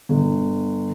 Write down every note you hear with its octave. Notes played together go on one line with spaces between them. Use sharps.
G1